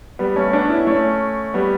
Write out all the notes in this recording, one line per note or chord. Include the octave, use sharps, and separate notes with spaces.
G3 B3
A3 C#4
B3 D4
C#4 E4
A3 C#4
G3 B3